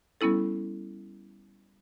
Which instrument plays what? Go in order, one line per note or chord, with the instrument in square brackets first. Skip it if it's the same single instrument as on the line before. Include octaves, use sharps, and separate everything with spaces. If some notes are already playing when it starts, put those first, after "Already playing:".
[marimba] G3 B3 C#4 E4 A4